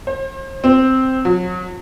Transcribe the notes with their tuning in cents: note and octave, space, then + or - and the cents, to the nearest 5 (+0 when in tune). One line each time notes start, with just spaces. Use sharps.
C5 +40
C4 -5
F#3 -35